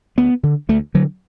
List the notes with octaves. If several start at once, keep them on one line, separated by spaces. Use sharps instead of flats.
D2 B3
D3
D2 A3
D3 F#3